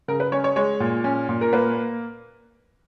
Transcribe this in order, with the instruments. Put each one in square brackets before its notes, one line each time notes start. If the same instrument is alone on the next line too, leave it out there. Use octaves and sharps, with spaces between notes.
[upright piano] C#3 A#4
B4
C#4 C#5
C#5
G#3 C#5
A#2
C#4
A#2
A#4
A#3 B4